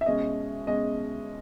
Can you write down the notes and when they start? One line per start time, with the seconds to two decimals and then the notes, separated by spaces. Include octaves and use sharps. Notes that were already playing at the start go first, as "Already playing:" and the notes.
0.01 E5
0.06 B2 G#3 C#4 D#5
0.67 B2 G#3 C#4 D#5